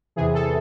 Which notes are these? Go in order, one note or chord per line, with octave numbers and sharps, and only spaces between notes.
E2 C3 E3 G#4
A4